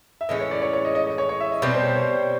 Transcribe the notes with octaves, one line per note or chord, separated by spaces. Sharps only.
E5
A2 E3 G#3 C#4 D#5
C#5
D5
C#5
C#5
D#5
D#5
D#5
C#5
C#5
E5
D#5
B2 G3 C4 D5
C5
C#5
C#5